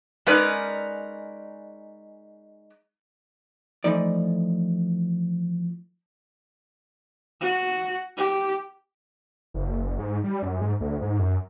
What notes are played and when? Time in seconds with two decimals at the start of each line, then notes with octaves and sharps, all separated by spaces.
0.26 G#3 C#4 D#4 A#4 B4 D5
3.84 E3 F3 A3 D#4 D5
7.41 F#4
8.17 G4
9.54 F#1
9.99 G#2
10.24 G3
10.43 F#2
10.61 G#2
10.80 D2
11.01 G#2
11.19 F#2